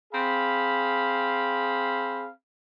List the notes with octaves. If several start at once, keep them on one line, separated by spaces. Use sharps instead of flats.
C4 G#4 F5 B5